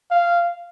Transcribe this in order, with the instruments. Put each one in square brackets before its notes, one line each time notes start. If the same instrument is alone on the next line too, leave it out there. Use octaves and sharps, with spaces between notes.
[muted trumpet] F5